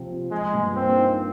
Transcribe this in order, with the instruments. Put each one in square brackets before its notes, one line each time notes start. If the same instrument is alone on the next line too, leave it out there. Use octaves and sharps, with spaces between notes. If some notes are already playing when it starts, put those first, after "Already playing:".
Already playing: [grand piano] C3 F3 C4
F4
[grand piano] F3 [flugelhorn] G#3
[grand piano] G2
[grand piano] A#3 [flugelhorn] C4
[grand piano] D#4